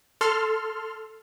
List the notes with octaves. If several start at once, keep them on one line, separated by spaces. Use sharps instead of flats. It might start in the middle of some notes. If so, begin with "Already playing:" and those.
A4 C6 F6